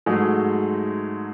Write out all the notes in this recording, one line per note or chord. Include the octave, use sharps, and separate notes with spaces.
G#2 F#3 G#3 A3 G#4